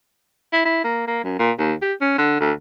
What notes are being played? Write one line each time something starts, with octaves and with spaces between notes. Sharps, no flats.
E4
E4
A#3
A#3
F#2
A#2
D#2
G4
C#4
D3
D2